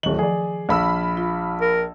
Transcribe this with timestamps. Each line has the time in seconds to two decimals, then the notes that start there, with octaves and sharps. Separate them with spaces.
0.03 D1 D#3 F#7
0.19 F3 G#4 D5
0.69 A#1 F5 B5 E6
1.17 F4
1.61 A#4